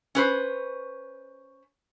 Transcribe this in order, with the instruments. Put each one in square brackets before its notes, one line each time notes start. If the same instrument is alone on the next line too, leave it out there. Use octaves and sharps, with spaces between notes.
[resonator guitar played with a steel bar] C#4 B4 C5